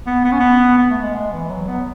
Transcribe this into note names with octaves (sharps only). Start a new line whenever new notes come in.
B3
B3
C#4
B3
B3
A3
G#3
G#3
E3
F#3
B3